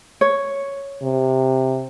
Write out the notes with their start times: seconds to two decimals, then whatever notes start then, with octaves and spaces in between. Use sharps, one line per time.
0.21 C#5
1.02 C3